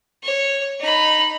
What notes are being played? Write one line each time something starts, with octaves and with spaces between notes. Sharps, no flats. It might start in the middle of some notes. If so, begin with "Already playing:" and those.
C#5
D#4 B5